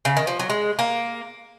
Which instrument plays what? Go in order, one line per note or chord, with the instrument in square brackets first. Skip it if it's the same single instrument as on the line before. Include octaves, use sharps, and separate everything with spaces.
[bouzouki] C#3
D#3
F3
F#3
G#3
A#3